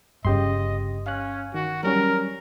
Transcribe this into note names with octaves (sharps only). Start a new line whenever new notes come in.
G1 G2 C#3 G4 D#5 C6
C#4 F5 F#6
D#3 F#4
F#3 G3 C#4 A#4